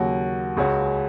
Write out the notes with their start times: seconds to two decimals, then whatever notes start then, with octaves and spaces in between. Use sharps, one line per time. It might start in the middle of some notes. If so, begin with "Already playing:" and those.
Already playing: D#2 C#3 F#3 C#4 F#4
0.57 C#2 C#3 G#3 C#4 F#4